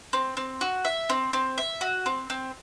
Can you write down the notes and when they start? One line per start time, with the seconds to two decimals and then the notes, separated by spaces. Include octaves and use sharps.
0.13 C4
0.37 C4
0.61 F#4
0.85 E5
1.10 C4
1.33 C4
1.58 E5
1.81 F#4
2.06 C4
2.30 C4